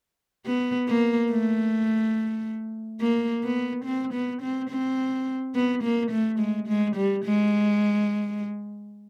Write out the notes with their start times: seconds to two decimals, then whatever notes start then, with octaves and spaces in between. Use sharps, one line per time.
0.46 B3
0.88 A#3
1.30 A3
3.01 A#3
3.43 B3
3.85 C4
4.13 B3
4.42 C4
4.70 C4
5.55 B3
5.83 A#3
6.11 A3
6.39 G#3
6.68 G#3
6.96 G3
7.25 G#3